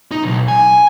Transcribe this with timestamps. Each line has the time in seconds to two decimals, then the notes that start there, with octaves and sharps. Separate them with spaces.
0.11 D#4
0.24 B1
0.48 G#5